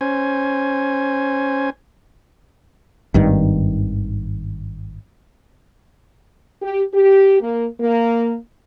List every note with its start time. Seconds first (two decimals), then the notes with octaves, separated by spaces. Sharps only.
0.01 C#4 C5 G#5
3.14 G#1 G2 D#3
6.62 G4
6.93 G4
7.40 A#3
7.80 A#3